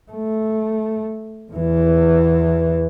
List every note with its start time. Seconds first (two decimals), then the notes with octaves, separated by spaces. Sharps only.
0.12 A3
1.52 E2 E3